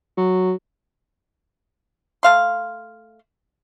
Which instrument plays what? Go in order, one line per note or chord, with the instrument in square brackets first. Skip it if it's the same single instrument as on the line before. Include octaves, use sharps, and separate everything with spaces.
[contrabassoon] F#3
[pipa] A3 F5 C6